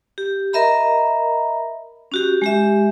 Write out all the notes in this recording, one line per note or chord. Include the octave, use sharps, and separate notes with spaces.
G4
A#4 D#5 E5 A#5 B5
C#4 F#4 G4
G#3 G4 E5